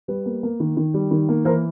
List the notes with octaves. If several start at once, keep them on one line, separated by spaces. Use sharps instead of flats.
G3 B4
A#3
A#3
D#3
D#3
G3
D#3
A#3
E3 A#4 C5